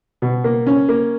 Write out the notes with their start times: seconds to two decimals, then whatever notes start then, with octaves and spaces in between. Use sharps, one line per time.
0.22 B2
0.44 A#3
0.67 C#4
0.89 A#3